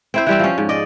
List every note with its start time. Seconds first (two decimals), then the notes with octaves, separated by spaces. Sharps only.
0.14 C4 E4 C5
0.27 E3 G3 C4
0.39 F3 C#4
0.58 G#2
0.69 D5 D#5